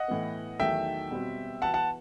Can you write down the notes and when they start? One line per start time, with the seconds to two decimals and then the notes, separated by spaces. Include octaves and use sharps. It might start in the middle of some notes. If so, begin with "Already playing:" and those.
Already playing: D#5 F#5
0.08 A2 E3 B3
0.60 E2 D#3 F#3 A3 E5 G5
1.11 B2 G3 C4 F#4
1.62 E3 B3 F#4 F#5 A5
1.74 F#5 A5